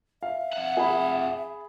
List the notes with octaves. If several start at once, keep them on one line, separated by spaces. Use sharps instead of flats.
E5 F5
F2 F#5
G#4 B5